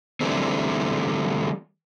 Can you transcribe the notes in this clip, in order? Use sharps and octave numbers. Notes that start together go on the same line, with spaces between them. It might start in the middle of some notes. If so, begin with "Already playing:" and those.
D3 E3 G3 A3 C4